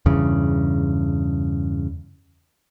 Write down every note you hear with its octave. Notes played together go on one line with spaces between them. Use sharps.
E2 G2 C#3